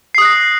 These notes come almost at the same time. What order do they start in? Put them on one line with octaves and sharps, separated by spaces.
C7 D#6 F#6 A#6